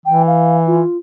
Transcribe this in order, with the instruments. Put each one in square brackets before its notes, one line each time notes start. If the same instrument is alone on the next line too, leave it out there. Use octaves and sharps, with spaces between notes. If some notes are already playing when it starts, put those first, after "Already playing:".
[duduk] E3 [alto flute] G5
[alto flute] F5
F4